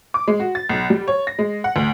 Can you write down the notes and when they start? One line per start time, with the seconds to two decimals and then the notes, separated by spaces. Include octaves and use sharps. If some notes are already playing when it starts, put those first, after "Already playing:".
0.14 D6
0.28 G#3
0.40 F#4
0.55 A6
0.69 B1
0.90 G3
1.08 C#5
1.27 A#6
1.39 G#3
1.64 F#5
1.76 D2